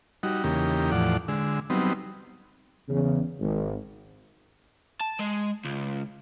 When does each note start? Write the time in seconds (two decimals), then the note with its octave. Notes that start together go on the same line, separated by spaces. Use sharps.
0.23 G3 D#4 F#4
0.44 E2 C#3 A#3 D#4 G4
0.92 E2 A2 F3 D5 F#5
1.28 D3 G#3 E6
1.70 F#3 G3 B3 C4 D#4
2.89 E2 C#3
3.40 G#1
5.00 A5
5.19 G#3
5.65 C#2